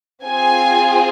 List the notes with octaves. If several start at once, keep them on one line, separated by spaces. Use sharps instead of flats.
C4 F4 G#4 G#5